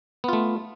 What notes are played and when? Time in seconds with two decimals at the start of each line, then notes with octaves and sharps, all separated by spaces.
0.24 B3
0.28 F4
0.33 A3